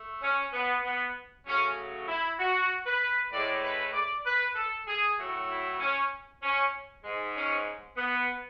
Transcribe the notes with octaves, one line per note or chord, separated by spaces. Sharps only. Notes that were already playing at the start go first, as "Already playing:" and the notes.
Already playing: A3
C#4
B3
B3
C#3 F#3 A3 C#4
E4
F#4
B4
A2 G#3 D5
B4
D5
B4
A4
G#4
A2 F#3 A3 F#4
E4
C#4
C#4
G#2 G#3
C#4
B3